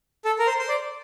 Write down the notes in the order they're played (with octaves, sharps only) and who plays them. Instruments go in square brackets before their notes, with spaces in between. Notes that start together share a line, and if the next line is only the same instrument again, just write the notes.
[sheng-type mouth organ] A4
A#4
C5
C5
D5